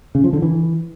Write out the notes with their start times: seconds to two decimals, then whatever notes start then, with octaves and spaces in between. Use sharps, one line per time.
0.15 C#3
0.24 F3
0.33 D3
0.42 E3